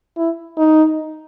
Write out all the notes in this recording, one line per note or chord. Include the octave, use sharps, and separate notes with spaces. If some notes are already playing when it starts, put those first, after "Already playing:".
E4
D#4